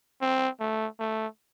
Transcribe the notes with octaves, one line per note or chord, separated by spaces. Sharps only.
C4
A3
A3